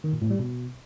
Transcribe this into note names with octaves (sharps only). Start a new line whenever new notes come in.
D#3
A#2
A2
G3
B2